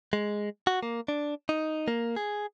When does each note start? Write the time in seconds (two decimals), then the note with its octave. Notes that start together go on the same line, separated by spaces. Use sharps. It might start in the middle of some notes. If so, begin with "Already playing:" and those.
0.13 G#3
0.67 F#4
0.83 A#3
1.08 D4
1.49 D#4
1.88 A#3
2.16 G#4